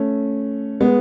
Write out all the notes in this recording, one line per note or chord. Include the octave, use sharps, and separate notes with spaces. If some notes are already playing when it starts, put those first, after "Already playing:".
Already playing: A3 C#4
G#3 B3